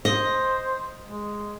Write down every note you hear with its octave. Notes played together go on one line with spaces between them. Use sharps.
C5 D#5
G#3